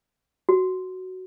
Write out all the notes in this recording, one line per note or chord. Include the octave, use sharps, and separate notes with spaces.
F#4